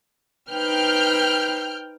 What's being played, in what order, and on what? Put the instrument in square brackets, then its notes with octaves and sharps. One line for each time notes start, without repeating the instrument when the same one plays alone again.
[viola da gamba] D#4 B4 C5 [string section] G5 F6 G6